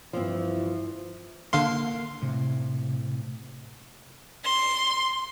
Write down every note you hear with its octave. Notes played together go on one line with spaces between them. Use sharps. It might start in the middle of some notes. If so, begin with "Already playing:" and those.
G2 E3 F3 C4
D3 A#3 F5 C6
A2 C3
C6